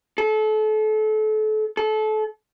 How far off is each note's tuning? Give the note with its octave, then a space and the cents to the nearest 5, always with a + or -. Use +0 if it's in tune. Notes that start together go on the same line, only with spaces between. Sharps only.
A4 -30
A4 -30